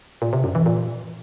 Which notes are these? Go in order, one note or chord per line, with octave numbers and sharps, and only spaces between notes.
A#2
C3
F#2
E3
A#2